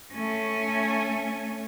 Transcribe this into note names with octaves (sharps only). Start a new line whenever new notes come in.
A3 C#4